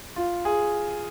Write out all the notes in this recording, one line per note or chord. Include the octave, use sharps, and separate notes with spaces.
F4
G#4